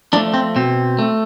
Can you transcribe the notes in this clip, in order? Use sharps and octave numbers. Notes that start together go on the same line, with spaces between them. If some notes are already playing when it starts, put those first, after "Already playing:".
F3 A3 D4
C4
B2 C4
A3